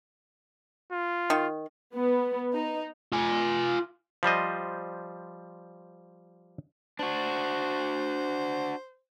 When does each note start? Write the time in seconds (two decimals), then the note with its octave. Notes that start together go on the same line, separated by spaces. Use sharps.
0.92 F4
1.30 D#3
1.94 B3
2.54 D#4
3.12 F4 G#5
4.23 F3 G3 C5 D#5
6.99 D4 F#4 C5